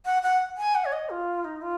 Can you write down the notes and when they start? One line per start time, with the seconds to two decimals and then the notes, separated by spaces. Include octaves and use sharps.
0.05 F#5
0.23 F#5
0.57 G#5
0.75 F#5
0.85 C#5
0.92 D#5
1.10 F4
1.44 D#4
1.62 F4